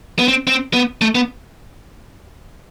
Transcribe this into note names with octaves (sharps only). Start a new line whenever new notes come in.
B3
C4
C4
B3
A3
B3